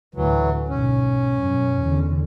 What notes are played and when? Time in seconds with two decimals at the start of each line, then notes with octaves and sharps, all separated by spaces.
0.15 D2 A2 E3 F#3
0.68 B1 G#2 C#4
1.40 F#2 B2
1.80 E2 D3